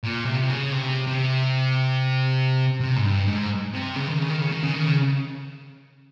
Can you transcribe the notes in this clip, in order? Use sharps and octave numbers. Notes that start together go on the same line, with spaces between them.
A#2
C3
C#3
C3
C3
C3
G#2
G2
G#2
C3
C#3
D#3
C#3
D#3
C#3
D#3
C#3
D#3
C#3